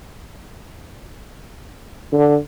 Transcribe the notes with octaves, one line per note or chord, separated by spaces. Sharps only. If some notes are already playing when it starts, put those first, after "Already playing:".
D3